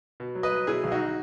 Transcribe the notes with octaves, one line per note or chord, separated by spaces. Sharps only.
B2
F#3
B4 D#5
F#3
B2 E4 G#4
B1
D#4 F#4